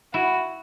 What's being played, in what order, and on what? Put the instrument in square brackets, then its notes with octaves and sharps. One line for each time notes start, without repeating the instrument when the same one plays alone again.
[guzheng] E4 [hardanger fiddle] F#4